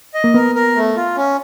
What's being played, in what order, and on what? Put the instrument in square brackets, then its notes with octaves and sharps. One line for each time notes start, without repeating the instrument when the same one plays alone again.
[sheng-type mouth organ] D#5
[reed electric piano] A#3
[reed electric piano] B3 [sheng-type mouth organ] A#4
[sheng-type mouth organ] A#4
A3
F4
C#4